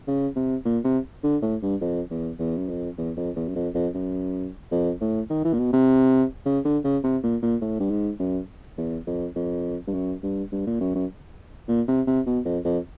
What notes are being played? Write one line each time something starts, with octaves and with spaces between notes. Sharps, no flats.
C#3
C3
A#2
C3
D3
A2
G2
F2
E2
E2
F#2
F2
E2
F2
E2
F#2
F2
F2
F#2
F2
A2
D#3
E3
A#2
B2
C3
C#3
D3
C#3
C3
A#2
A#2
A2
G2
G#2
F#2
E2
F2
F2
G2
F#2
G2
G2
A#2
F#2
F#2
A#2
C3
C3
B2
F2
F2